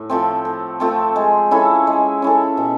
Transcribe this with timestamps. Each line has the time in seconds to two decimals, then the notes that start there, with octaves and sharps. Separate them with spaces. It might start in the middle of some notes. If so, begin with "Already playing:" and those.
Already playing: A2
0.10 F3 A3 C4
0.45 A2
0.80 F3 A3 C4
1.16 G#3
1.51 C#4 E4 A4
1.87 G#3
2.22 C#4 E4 A4
2.57 B2